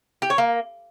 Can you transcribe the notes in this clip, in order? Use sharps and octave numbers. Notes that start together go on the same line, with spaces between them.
G4
C#5
A#3